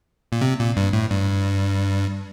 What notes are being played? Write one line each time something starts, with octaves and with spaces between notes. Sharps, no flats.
A#2
C3
A#2
G2
A2
G2